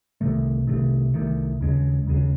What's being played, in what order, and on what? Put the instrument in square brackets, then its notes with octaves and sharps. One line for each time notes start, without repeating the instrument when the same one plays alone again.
[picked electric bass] C2 C3 D#3 A3
C2 C3 D#3 A3
C2 C3 D#3 A3
D#2 C#3 G#3
D#2 C#3 G#3